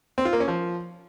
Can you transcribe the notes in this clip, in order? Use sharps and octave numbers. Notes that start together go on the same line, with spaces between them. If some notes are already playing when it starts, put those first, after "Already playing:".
C4
F4
A#3
C#4
F3